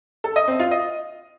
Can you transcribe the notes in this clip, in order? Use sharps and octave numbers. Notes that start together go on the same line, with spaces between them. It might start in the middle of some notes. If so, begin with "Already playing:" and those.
A4
D#5
C4
F4
D#5